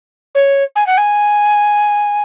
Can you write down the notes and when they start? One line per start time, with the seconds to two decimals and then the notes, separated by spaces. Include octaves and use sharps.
0.35 C#5
0.75 G#5
0.86 F#5
0.97 G#5